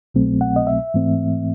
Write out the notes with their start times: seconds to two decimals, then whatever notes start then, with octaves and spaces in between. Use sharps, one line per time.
0.14 C2 B2 F#3 A3 C4
0.41 F#5
0.56 D#5
0.67 E5
0.94 G#2 E3 A3 C4